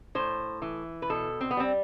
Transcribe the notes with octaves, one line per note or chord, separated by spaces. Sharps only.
A2 C5
E3
B4
B2 A4
C4
B3
G3 C4